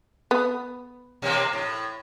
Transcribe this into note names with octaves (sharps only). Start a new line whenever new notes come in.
B3
B2 A#3 C4
A2